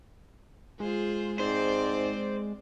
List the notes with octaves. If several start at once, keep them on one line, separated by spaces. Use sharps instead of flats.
G#3 F4 G#4 C5
G#2 C4 C5 D5